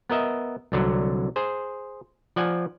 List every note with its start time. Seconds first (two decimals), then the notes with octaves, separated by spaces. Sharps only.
0.10 B3 A#4 D#5 E5
0.72 C2 D3 F#3
1.36 G#4 C5
2.36 F3 D5 F#5 G#5